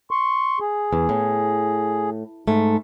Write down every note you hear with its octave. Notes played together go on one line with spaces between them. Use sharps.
C6 C#6
G#4
E2
A2
G#2 A3